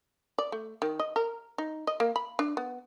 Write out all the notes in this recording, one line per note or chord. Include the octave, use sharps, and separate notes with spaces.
D5
A3
D#3
D#5
A#4
D#4
D#5
A#3
B5
D4
B3